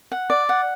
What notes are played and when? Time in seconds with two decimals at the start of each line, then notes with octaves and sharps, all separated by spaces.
0.12 F#5
0.30 D5
0.49 F#5